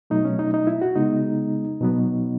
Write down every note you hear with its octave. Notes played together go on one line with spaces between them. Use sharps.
B2 F#3 A3 D#4
C#4
D#4
D#4
E4
F#4
C#3 G#3 B3 D#4
B2 F#3 B3